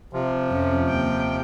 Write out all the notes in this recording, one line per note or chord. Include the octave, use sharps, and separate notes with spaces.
C3 F3
F2 C#4
D#2 G5